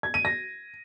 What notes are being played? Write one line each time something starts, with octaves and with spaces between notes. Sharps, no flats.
G#6
D#7
A#6